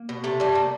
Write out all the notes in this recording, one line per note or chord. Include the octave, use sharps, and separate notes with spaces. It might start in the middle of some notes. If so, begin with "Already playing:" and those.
Already playing: A#3
B2
C3 A3
G3 A3
C3 A#3